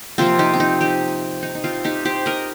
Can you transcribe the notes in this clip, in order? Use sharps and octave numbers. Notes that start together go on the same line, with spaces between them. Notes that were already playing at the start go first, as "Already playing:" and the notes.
C3 F3 A#3 C4 F4
D#4 G4
C4
D#4
D#4 G4
D#4
D#4
C4 F4
D#4 G4
G4 C5
A#4 D#5